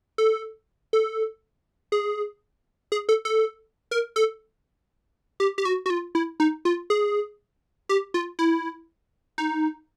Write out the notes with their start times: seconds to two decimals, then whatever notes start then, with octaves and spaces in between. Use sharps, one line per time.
0.18 A4
0.93 A4
1.92 G#4
2.92 G#4
3.09 A4
3.25 A4
3.91 A#4
4.16 A4
5.40 G4
5.58 G4
5.65 F#4
5.86 F#4
5.90 F4
6.15 E4
6.40 D#4
6.65 F4
6.90 G#4
7.89 G4
8.14 F4
8.39 E4
9.38 D#4